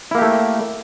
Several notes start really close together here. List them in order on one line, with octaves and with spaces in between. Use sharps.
E4 A#3 G4 A3